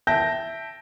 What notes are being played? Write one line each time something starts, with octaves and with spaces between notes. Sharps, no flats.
E5 G5 A5 G6 A#6